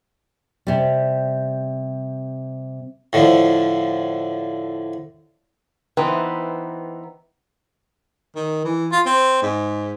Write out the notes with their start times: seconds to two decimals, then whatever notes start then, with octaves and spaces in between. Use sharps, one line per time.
0.67 C3 G3
3.13 A2 D3 F3
5.97 E3 B3 C4 D#4
8.36 D#3
8.65 E3
8.92 F4
9.06 C4
9.42 G#2